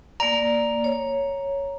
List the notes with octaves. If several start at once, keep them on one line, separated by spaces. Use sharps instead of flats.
A#3 D5 A#5
C#5